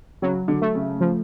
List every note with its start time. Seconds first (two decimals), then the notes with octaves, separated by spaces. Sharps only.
0.22 C#3 F#3
0.48 D3
0.62 A3
0.75 C#3
1.01 F3